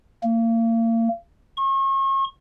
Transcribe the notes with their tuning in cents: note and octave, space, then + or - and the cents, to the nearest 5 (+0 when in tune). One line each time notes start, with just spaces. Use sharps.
A#3 -35
C#6 -40